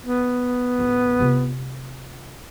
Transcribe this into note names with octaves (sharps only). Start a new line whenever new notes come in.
B3
A1 D2
C3 F4